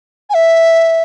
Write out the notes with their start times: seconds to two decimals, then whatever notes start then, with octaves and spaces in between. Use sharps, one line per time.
0.30 G#5
0.34 E5